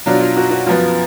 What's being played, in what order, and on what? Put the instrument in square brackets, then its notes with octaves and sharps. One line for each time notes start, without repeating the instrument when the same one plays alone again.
[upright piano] B2 F#3 D4 [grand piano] F4
[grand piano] F4
F#4
F#4
[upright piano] F#2 F3 B3 [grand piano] F4